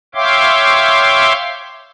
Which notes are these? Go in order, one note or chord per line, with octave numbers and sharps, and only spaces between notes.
C#5 E5 F5 G5 C6 D6